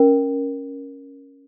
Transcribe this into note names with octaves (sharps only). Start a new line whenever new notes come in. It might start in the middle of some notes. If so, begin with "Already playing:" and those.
Already playing: C#4 A#4